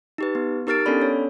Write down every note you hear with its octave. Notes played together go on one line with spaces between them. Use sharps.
D#4 G4 B4
B3
D#4 G4 A#4 F6 A6 D7
B3 C#4 D4 A4 D5 B5
C#5